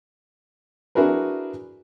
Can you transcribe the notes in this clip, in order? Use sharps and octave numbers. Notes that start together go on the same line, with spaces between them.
D4 E4 F#4 G#4 A#4 B4